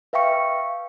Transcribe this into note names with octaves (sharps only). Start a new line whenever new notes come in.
B4 E5 F5 G5 C#6 C#7